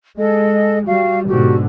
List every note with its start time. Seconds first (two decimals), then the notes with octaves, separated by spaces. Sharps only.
0.17 G#3 A4 D#5
0.87 G3 F#4 F5
1.28 G#2 B2 D3 F#4 G4